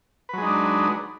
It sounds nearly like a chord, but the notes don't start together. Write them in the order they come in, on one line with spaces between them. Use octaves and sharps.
B4 F#3 G#3 D#4 D4